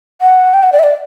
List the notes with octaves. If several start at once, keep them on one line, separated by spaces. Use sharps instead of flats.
F#5
G5
F#5
D5
E5
D5